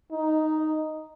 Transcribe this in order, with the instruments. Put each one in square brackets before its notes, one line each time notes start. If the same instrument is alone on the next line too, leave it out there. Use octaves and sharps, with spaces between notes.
[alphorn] D#4